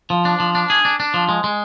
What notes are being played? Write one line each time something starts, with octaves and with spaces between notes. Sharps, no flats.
F3
D4
F3
D4
G#4
D4
D4
F3
G#3
G#3